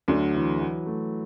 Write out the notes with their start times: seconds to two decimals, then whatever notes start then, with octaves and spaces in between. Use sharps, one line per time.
0.08 D2 D3 F#3 A3
0.34 E3
0.60 F#3
0.86 A3